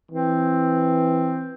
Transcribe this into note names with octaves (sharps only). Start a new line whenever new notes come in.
E3 C4